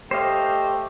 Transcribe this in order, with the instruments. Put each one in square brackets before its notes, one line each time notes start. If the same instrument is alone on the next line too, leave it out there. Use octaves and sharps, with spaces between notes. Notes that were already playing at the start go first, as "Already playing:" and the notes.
[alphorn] A3 [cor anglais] G4 [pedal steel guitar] C5 D#5 F5